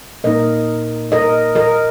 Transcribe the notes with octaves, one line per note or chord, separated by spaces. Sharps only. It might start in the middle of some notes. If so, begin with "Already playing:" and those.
A#2 A#3 D#4 A#4 D#5
A#4 D#5
A#4 D#5